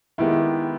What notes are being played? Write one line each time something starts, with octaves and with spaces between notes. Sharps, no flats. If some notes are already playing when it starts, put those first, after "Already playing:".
D#3 G#3 B3 E4 G4